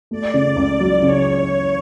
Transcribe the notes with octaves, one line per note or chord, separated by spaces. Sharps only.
A3 D5
C#3
C#2
F#3
C#3 C#5